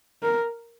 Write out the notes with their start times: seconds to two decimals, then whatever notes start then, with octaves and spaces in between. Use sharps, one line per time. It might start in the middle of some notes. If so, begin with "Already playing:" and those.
0.23 A#4